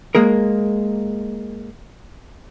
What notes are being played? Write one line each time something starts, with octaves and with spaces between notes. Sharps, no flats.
G#3 A#3 G#4 A#4